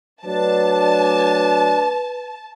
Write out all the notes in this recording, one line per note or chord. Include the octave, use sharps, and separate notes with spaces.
F#3 A3 D4 B4 A5